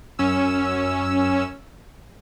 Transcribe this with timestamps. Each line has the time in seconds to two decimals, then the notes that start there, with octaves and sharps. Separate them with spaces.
0.19 F#2 C#4 E6